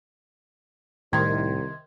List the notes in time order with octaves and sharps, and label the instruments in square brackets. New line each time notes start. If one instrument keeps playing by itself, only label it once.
[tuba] C2 [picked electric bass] A2 [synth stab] C3 D#3 [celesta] C6 G#6